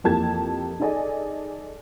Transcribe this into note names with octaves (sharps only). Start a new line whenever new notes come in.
F2 E3 A#3 G4 A5 G#6
D#4 G#4 A4 D5 D#5 G#5